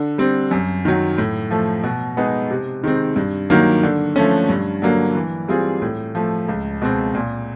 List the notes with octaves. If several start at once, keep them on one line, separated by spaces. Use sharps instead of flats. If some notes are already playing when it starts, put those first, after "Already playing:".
Already playing: D3
G3 C4
F#2
D#3 F#3
A2
F3 A3
B2
G#3 B3 D#4 G#4
C3
D#3 G#3 C4
G2
D#3 F#3 A#3
D3
F3 A3 C#4
G2
D3 F#3 A#3
E3
G3 C4 F4 G#4
A2
F3 A3
C#2
B2 G#3 C4
A#2